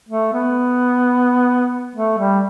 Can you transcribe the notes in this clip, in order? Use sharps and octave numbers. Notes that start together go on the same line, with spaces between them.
A3
B3
A3
G3